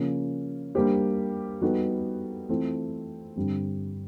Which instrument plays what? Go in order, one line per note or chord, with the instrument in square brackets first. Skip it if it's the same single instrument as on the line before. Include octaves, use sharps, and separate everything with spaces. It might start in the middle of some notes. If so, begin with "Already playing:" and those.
Already playing: [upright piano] C#3 F3 A#3 C#4
G3 A#3 D4 G4 C5
G3 B3 D#4 F#4 A4
E3 A3 C4 F4
G2 D3 G3 C4